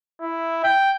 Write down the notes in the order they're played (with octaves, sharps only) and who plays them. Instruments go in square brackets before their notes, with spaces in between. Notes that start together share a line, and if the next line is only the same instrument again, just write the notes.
[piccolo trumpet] E4
G5